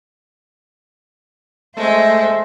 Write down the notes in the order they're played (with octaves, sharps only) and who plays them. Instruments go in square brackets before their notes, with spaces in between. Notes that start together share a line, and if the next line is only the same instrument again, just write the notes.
[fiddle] G#3 [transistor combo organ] A3 [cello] C5 [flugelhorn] E5